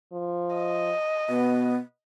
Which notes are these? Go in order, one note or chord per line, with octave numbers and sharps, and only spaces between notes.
F3
D#5
B2 B3